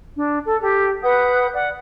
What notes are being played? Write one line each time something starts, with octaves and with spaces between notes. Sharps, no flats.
D4
A4
G4 A4
B4 F#5 D#6 G6
D5 F#5